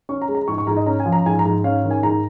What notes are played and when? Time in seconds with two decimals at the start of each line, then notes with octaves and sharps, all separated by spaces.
0.09 C#4 C#6
0.22 A#5
0.28 G#3
0.35 A#5
0.48 G#2 C#6
0.58 C#6
0.67 G#2 A#5
0.77 D#5
0.86 C#4 A#5
1.00 G#5
1.06 F3
1.12 A#5
1.26 G#2 G#5
1.39 A#5
1.45 G#2
1.64 C#4 F5
1.84 D#3
1.91 G#5
2.03 G#2 A#5